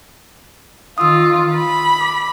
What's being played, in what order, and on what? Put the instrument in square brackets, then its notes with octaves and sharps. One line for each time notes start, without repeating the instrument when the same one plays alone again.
[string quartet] D#3 F4 [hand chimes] D#6 E6
[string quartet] B5
[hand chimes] D6